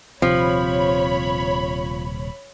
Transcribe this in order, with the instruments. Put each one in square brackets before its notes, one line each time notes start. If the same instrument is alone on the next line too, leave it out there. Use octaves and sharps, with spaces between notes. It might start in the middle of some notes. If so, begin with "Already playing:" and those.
[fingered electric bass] D#1 C3 C4 [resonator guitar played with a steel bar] F3 [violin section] C#5 B5